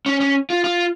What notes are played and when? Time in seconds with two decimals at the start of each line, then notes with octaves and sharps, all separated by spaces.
0.06 C#4
0.21 C#4
0.50 F4
0.64 F4